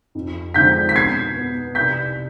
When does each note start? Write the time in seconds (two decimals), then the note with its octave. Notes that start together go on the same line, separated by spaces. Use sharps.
0.15 F2
0.54 D3 F3 G#3 C4 G6 B6
0.89 B6
0.95 B2 G#6 C7
1.36 B3
1.75 C2 G6 B6